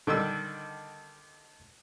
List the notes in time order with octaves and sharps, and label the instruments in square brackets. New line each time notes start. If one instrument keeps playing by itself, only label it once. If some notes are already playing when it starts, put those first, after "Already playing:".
[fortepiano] D3 D#3 G3 E6